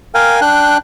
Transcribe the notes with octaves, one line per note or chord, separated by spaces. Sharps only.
A#4 F5 G5 G#5
D4 G5 F#6